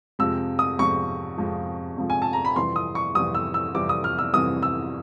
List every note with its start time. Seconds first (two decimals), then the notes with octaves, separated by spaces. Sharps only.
0.19 F2 C3 F3 G#3 E6
0.59 D#6
0.78 F2 C3 F3 G#3 C#6
1.37 F2 C3 F3 G#3
1.97 F2 C3 F3 G#3
2.10 G#5
2.22 A5
2.33 A#5
2.45 B5
2.56 F2 C3 E3 G3 C6
2.76 D#6
2.95 C#6
3.15 F2 C3 E3 G3 D#6
3.35 E6
3.54 E6
3.74 F2 C3 E3 G3 D6
3.89 D#6
4.04 F6
4.19 E6
4.33 F2 C3 E3 G3 D#6
4.63 E6